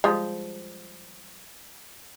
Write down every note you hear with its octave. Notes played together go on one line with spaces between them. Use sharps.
F3 G3 G#3